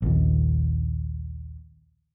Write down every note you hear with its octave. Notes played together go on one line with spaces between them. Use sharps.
A#1 D#2